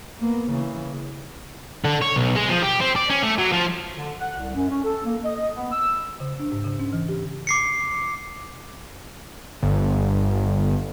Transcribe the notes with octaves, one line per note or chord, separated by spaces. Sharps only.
A#3 B3
C#3 E3
D3
C#5
B1
G#3
F3
G4
C4
D5
C#4
A3
F#3
F3
D3
F#5
C2
F#2
C#4
A4
A#3
D#5
D#5
B3
E6
C#3
D4
G#2
C#3
C#4
E3
G4
D6 C7 C#7
G1